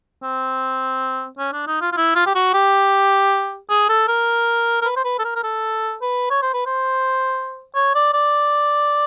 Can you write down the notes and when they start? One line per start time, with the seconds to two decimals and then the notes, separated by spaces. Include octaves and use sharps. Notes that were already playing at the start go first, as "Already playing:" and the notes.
0.23 C4
1.38 C#4
1.53 D4
1.67 D#4
1.81 F4
1.92 F4
1.97 E4
2.16 F4
2.27 G4
2.35 F#4
2.54 G4
3.70 G#4
3.89 A4
4.08 A#4
4.82 A#4
4.85 B4
4.96 C5
5.05 B4
5.19 A4
5.24 A#4
5.36 A#4
5.43 A4
6.02 B4
6.30 C#5
6.42 C5
6.54 B4
6.66 C5
7.75 C#5
7.95 D5
8.14 D5